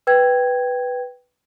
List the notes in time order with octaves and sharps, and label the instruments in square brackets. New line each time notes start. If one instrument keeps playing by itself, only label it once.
[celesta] B4 G5 G#6